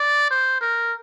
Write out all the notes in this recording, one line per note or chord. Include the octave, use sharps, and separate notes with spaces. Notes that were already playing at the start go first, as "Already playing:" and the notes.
Already playing: D5
C5
A#4